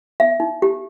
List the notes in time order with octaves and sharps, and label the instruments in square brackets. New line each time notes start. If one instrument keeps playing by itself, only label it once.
[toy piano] E5
D#4
G4